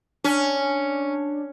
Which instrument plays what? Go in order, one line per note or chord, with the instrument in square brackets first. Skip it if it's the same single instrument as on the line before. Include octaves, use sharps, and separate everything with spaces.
[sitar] C#4 [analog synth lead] D4